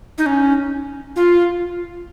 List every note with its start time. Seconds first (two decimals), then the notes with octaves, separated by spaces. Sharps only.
0.18 D#4
0.26 C#4
1.16 F4